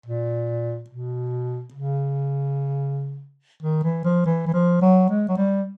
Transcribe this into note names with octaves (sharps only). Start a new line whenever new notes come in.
A#2
B2
C#3
D#3
E3
F3
E3
E3
F3
F#3
G#3
F#3
G3